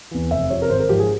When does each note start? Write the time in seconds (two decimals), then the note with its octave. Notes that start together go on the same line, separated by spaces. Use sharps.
0.11 E2 E3
0.31 F1 E5
0.50 F2 C3 F3 C#5
0.62 A#4
0.69 G#1 C5
0.80 A#4
0.89 G#2 F3 G4
0.99 G#4